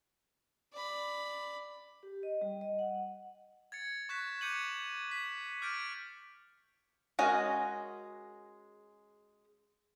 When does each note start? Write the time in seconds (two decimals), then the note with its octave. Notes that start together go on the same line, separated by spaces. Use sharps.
0.73 D5 B5
2.03 G4
2.23 D#5
2.41 G3
2.61 D#5
2.79 F#5
3.72 G#6 A6 C#7
4.09 C#6 F#6 B6 E7
4.41 D6 G6 C#7 D#7 E7 F#7
5.11 B6
5.62 D6 F6 G6 A6 D7
7.19 G#3 C#4 F#4 A#4 D#5